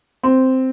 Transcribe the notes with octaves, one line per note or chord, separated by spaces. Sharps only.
C4